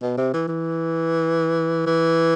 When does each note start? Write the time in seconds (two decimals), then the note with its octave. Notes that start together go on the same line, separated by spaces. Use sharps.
0.02 B2
0.18 C3
0.33 E3
0.48 E3
1.86 E3